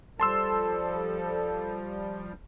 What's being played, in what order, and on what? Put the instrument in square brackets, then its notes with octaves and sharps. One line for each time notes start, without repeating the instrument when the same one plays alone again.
[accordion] F3 G3 [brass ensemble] A4 [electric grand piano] A5 C6 E6